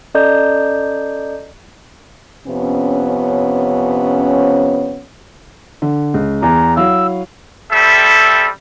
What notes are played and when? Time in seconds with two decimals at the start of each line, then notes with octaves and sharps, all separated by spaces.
0.14 C#4 A4 D5 D#5 A#5 G6
2.47 F2 C3 B3 C#4
5.82 D3
6.14 C#2
6.43 E2 A#5
6.77 F#3 E4 F5 E6
7.72 G3 C4 A4 E5 B5